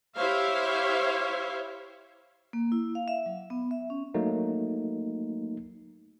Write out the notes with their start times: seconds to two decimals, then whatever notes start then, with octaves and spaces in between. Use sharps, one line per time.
0.17 E4 G4 C5 C#5 E5 F5
2.53 A#3
2.72 E4
2.95 F5
3.08 E5
3.26 F#3
3.50 B3
3.71 E5
3.90 C#4
4.14 F#3 A3 A#3 D#4